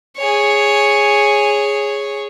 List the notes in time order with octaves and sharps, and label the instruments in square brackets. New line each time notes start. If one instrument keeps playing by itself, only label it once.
[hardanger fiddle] G#4 C#5